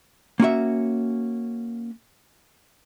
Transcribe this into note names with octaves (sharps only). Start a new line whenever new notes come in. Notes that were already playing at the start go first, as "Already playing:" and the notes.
A#3 C#4 F#4 E5